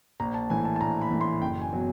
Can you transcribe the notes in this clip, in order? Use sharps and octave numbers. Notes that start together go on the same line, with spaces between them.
A#1 A#5
A5
A2 E3 G#5
A5
A5
A#1 A#5
B5
A2 E3
C6
F#1 G5
G#5
B2 F#3